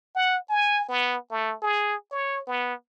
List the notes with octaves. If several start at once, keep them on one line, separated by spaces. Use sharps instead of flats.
F#5
G#5
B3
A3
G#4
C#5
B3